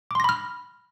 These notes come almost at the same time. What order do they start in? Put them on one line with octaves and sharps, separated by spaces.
D6 C6 A#6 B5 F6